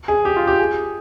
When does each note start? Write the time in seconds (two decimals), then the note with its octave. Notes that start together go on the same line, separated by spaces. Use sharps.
0.08 G#4
0.25 G4
0.36 F4
0.47 G4
0.59 G#4